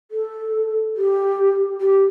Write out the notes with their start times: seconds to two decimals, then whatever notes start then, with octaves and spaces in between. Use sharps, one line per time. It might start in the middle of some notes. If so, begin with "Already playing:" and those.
0.11 A4
0.96 G4
1.81 G4